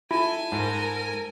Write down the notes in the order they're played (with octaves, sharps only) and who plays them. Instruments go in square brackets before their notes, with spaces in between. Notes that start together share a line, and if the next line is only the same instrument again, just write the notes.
[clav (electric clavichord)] E4 [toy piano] F4 [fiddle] A4 G#5
[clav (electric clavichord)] G#2 [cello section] A#4